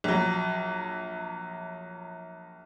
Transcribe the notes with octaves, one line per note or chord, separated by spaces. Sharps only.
A#1 F#3